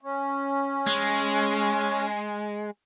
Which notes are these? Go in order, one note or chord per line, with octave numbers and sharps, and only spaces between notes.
C#4
G#3